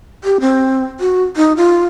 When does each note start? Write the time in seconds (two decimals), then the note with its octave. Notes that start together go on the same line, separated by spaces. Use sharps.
0.24 G4
0.40 C4
1.00 F#4
1.36 D#4
1.57 F4